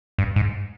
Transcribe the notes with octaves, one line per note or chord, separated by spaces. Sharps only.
G2
G#2